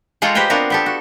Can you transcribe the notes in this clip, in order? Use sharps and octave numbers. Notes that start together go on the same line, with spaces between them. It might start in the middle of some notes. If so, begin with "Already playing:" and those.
G#3 F4 A4 C#5 G5 A#5
G4 B4 C5 D#5 G5 G#5
B3 C4 D4 F4 F#4 A#4
B3 G4 A4
F#4